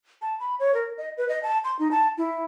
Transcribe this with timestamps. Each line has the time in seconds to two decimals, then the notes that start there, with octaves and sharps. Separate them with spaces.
0.22 A5
0.40 B5
0.60 C#5
0.74 A#4
0.98 D#5
1.17 B4
1.29 D#5
1.43 A5
1.64 C6
1.79 D#4
1.91 A5
2.18 E4